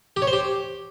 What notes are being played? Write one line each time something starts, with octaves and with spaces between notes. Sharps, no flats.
G4
C#5
C5
G4